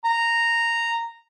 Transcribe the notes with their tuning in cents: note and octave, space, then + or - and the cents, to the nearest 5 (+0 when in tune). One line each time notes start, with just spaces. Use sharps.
A#5 -10